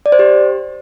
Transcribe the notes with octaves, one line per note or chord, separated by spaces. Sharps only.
D5
C5
G4